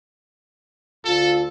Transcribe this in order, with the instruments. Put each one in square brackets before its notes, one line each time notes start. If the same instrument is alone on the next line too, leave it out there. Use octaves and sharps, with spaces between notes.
[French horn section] D2 F4 [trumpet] A4